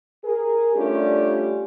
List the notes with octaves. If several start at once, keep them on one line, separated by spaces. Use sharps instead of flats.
G#4 A#4
G3 A3 C#4 D4 F4 G4